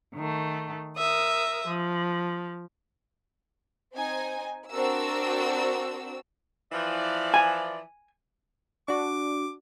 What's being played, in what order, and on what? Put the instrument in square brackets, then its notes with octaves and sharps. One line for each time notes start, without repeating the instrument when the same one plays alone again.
[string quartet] D#3 A3
A#4 E5 D#6
F3
[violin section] C4 D#4 G#5
C4 D4 F#4 A#4 E6
[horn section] E3 F3 D5
[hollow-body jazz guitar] G#5
[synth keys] D4 F#4 [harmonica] D6